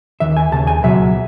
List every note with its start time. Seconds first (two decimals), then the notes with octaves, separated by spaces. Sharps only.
0.20 D#2 D#3 E5
0.37 G#5
0.52 D#2 C#3 A5
0.67 G#5
0.83 C#2 B2 F#3 E5